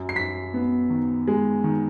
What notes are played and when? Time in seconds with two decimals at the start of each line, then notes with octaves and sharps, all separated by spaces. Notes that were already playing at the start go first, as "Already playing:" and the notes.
Already playing: F#2
0.09 C7
0.15 F#2 B6
0.54 B3
0.90 D#3
1.27 G#3
1.64 D#3